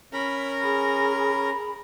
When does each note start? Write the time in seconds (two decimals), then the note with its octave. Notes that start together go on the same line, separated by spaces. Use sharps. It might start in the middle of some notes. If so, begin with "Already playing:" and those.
0.13 C#4 A#4 A#5 B5
0.61 G#4 B5